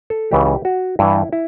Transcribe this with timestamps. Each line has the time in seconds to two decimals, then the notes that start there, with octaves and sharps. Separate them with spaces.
0.10 A4
0.31 C#2 C#3 E3 G4
0.65 F#4
0.99 G2 E3 E4
1.33 E4